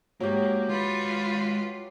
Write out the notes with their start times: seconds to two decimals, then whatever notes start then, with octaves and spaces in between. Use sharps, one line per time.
0.20 G#2 F#3 A#3 G4
0.69 G#3 F4 B4 B5